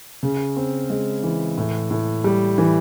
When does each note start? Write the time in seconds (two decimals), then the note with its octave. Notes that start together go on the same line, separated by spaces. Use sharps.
0.23 C#3
0.57 C4
0.90 G#3
1.23 E3
1.58 A2
1.91 A2
2.24 G3
2.58 E3